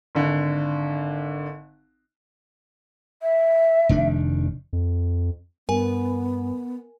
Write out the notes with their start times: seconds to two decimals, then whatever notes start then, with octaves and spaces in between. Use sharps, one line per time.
0.15 G#1 D3
3.22 E5
3.89 F1 D#3 D4
4.73 F2
5.69 G2 B3 A#4 G#5